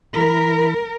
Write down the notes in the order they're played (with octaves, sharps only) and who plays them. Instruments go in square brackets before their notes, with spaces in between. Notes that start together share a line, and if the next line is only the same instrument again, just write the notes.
[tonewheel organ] E3 B5 [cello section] A#4